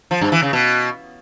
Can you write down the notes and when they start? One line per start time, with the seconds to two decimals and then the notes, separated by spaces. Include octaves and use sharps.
0.11 F3
0.21 G2
0.32 E3
0.42 C#3
0.53 B2